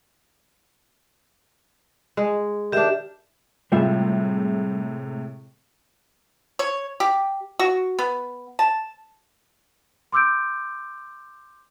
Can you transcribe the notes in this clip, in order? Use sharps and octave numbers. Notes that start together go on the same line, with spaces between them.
G#3
D#3 D4 G4 E5
A2 C3 G3 G#3 F4 E5
C#5
G4
F#4
B3
A5
C6 D6 E6 G6 D7